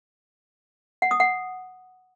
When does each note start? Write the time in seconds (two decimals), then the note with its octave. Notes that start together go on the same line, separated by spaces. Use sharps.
1.02 F#5
1.11 D#6
1.20 F#5